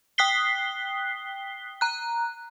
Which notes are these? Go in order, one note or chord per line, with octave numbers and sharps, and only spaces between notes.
G5 D#6 F#6 B6 C7 G7
A#5 F#6